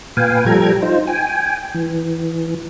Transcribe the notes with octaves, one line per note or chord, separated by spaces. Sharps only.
A#2 B4 F5 G5 G#5
F3 G3 A4 G5 A#5 G#6
D#4 F4 C5
G5 G#5
E3